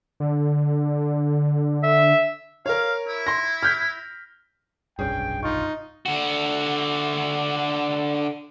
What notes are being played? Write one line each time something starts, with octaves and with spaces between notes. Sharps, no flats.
D3
E5
A#4 C#5 F5
E4
C6 A#6
F6 G6 B6
F1 B1 G2 C#4 G#4 G5
D#4 F4 C#6
D3 F#4